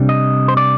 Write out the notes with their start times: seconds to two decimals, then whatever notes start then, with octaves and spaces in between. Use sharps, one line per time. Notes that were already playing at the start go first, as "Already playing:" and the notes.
Already playing: C3 G3 D4
0.09 D#5
0.48 C5
0.57 D5